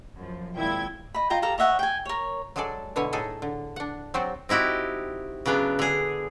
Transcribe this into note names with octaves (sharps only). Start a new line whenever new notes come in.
F#2 F3
G#1 A#2 E4 G5 G#6
D#5 B5
F4 D#5 G5 A#5
G4 A4 F5 A#5
C#5 D#5 E5 F#5
G5 G#5
A#4 C#5
F#3 G#3 G#4 A4 D5
B2 D3 E4 C#5 G#5
A2 D#4 G#4 A4 D#5
D3
D4 F#5
F#3 C4 F#4 G4 C5 D5
C4 D#4 E4 F#4 G4
C#3 F#3 B3 D4
D3 G#4